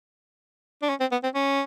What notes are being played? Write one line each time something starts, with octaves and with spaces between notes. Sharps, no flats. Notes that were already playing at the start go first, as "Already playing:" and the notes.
D4
C#4
C4
B3
C4
C#4